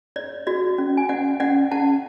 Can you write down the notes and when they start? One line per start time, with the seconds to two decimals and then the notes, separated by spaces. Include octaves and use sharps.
0.16 C#5 D5
0.47 F#4 D5
0.78 C#4
0.97 G#5
1.09 C#4 D5 F#5
1.40 C#4 D5 F#5
1.72 C#4 F#5 A5